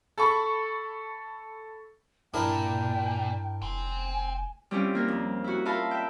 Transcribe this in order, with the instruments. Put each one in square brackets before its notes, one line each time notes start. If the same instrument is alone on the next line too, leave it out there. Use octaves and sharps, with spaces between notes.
[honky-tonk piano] A4 B5 C#6
[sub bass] G2 [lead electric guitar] A#2 [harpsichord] D4 E4 A#4 [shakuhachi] G5
[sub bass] F1 [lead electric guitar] G5 C6 [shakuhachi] G#5
[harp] G3 C4 C#4 E4 F4 G4
E3 A#3 A#4
F2
E4 F#4
F4 A#4 E5 F5 A5 B5
E5 G5